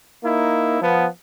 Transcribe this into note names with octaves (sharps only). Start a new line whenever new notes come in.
A#3 D#4 E4
F3 B3